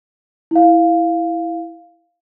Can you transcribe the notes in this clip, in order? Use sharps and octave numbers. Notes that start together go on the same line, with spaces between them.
E4 F5